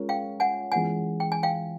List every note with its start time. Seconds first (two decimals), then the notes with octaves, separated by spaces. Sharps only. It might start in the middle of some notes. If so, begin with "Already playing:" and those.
Already playing: G#3 C#4 F4 A#4 C#5
0.09 F5 G5
0.40 F#5 G#5
0.72 E3 G#3 C#4 F4 F#5 G#5
1.20 G5
1.32 G#5
1.43 F5 G5